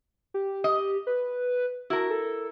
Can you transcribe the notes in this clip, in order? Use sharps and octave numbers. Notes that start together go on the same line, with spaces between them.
G4
D#5
B4
E4 F#4 A#4
A4